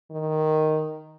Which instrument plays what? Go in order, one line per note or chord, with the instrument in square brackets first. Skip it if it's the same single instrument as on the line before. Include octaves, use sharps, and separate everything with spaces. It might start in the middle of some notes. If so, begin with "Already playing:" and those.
[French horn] D#3